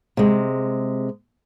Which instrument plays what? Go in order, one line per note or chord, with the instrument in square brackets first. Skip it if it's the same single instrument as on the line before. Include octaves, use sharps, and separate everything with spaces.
[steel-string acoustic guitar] C3 G#3